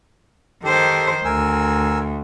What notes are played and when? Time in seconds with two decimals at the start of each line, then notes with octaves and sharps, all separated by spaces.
0.64 D#3 G4 A4 C5
1.25 D2 A#4 G#5 E6